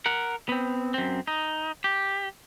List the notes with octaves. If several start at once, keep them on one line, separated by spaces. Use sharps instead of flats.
A#4 F#5
B3 C4
F#2 C4
D#4
G4